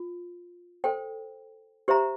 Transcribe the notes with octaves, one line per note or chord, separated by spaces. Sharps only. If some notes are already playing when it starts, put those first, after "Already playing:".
Already playing: F4
A4 C5 G5
G4 C5 E5 A#5